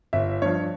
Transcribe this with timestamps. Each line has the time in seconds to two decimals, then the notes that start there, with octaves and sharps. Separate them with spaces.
0.13 G1 E5
0.42 G2 F3 C#5